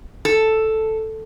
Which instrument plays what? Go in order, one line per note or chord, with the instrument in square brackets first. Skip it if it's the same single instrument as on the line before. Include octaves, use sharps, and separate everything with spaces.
[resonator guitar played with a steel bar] A4